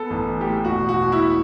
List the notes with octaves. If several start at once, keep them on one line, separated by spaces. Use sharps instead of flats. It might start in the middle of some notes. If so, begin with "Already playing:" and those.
Already playing: B3 A4
A1
E3
G4
A2
E1 F#4
E1
F#4
B2
E4